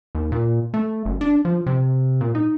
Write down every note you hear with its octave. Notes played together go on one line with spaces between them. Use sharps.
D#2
A#2
A3
F#1
D4
F3
C3
A#2
D#4